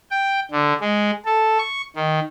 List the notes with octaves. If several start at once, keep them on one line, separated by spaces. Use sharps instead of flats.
G5
D3
G#3
A4
C#6
D#3